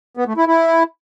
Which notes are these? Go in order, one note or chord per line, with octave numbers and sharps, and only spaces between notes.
B3
A3
E4
E4